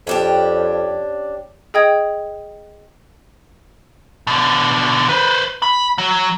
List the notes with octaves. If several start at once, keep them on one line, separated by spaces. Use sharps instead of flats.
F2 C#4 D4 G4
G#4 D#5 G5 D#6 G#6
B2 D3
B4 C5
B5
F#3